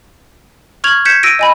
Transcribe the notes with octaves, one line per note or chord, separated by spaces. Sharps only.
C#6 F6 G#6 F7 F#7
G6 G#6 B6 C#7 E7
E6 A#6 D7 D#7
D#5 G#5 B5